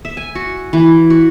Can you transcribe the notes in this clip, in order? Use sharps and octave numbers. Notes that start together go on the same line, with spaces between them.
E5
G#5
F#4
E3
F#4